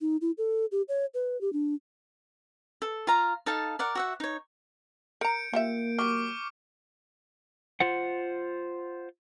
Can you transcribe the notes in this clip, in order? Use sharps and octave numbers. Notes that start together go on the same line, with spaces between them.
D#4
E4
A4
G4
C#5
B4
G4
D4
A4
F4 F5 A#5
D#4 A4 F5 A5
A#4 D5 F#5
F#4 E5 F#5
D#4 C#5
A#4 A#5 G6 C#7 D7
A#3 F4 G4 E5
F#3 G3 C#6 D6 F6
F4 C5 F#5